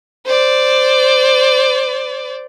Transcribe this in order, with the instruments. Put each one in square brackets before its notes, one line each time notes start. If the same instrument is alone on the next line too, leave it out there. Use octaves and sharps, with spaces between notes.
[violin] C5 D5